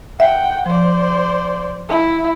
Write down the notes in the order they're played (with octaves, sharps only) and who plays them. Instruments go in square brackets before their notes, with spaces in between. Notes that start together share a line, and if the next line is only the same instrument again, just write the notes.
[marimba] E5 [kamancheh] F#5 G5
[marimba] F3 [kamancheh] C5 D5
[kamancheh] E4